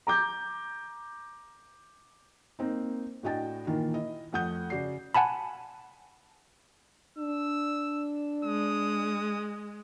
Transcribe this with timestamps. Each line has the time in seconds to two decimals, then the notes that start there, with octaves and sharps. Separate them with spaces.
0.07 A#5 D6 G6
2.59 A#3 C4 D#4
3.23 A2 D4 F#4 D#5 G5 A6
3.67 A#2 D#3 E3 A#3
3.94 E4 D#5
4.33 F2 A3 F#5 D#6 G6
4.70 C#3 F#4 D5 C7
5.14 F#5 G#5 A5 B5
7.18 D4 E6
8.45 G#3 D#6